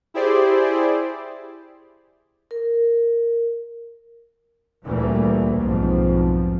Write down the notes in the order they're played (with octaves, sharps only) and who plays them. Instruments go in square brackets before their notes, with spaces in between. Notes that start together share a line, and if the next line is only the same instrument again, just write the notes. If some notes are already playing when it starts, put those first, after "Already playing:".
[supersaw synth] E4 G4 G#4 C5 D5
[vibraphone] A#4
[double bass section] D2 A#2 E3 G3 A3 A#3
B1 F2 G#2 F3